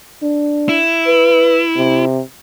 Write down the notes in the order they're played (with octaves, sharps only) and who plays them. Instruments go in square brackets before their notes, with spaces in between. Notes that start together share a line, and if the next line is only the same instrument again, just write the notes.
[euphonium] D4
[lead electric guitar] E4
[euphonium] B4
C3